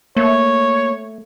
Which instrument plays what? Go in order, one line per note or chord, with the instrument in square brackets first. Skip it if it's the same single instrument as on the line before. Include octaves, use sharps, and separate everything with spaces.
[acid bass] A3 [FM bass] A#3 [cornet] C#5